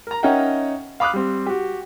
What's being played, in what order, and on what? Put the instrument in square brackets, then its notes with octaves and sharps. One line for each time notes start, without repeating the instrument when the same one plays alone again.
[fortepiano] A#4 A#5
C#4 D#4 A#4 E5 F#5 G5
F5 B5 D6 D#6 F6 F#6
G3 C4
F#4 G4